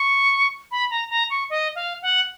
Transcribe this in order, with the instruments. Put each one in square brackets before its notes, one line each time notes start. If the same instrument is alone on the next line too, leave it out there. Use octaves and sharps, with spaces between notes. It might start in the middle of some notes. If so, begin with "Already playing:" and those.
Already playing: [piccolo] C#6
B5
A#5
A#5
C#6
D#5
F5
F#5